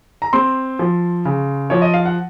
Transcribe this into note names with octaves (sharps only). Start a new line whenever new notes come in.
A#5
C4 C6
F3
C#3
F3 C#5
D#5
F5
F#5